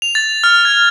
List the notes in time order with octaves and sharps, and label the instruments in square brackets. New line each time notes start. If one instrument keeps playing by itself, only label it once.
[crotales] F7
A6
F6
G#6